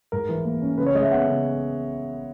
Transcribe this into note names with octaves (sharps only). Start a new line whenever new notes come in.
G#2 A#4
E3
A#3
C#4
C#3 B4
C#5
G#3 D#5
E5
B3 F#5
C#3